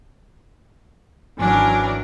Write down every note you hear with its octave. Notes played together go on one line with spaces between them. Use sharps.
G#1 E3 F#3 C#4 D4 A#4 G#5